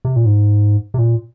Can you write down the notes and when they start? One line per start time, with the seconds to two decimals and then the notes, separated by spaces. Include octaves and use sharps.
0.05 C3
0.16 A#2
0.25 G#2
0.94 C3
0.98 A#2